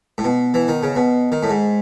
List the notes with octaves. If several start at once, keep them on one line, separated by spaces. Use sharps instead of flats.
A2
B2
E3
D#3
C#3
B2
D#3
A2
G#2